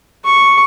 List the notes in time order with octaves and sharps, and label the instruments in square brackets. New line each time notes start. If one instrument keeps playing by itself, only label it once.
[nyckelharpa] C#6